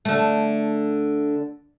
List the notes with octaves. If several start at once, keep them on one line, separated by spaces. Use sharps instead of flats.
D3 A3